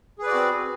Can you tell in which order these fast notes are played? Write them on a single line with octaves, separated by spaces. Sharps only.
G#4 B4 D5 F#4 C4